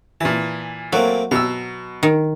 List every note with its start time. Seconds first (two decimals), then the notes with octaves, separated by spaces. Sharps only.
0.21 A#2 E3 A5
0.93 F#3 A3 A#3 C4
1.31 B2 A#5 E6
2.03 D#3